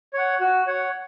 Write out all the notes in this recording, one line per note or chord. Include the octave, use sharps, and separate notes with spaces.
C#5 F#5
F#4
C#5 F#5